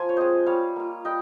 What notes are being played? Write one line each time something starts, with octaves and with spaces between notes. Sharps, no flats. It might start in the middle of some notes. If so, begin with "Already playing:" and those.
Already playing: F3 G#5 A#5 C6
C#5
G#3 C4 C5 D#5
G3 C#5 F5
A#3 F4
G3 D#5 G5